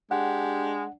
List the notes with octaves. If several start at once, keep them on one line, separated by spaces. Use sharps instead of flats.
G#3 D4 G4 F#5